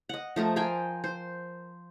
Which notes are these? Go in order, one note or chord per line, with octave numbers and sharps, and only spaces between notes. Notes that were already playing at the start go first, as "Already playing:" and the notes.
D#5 F#5
F3 A3 A#4
A#4 C5 G5 G#5
C5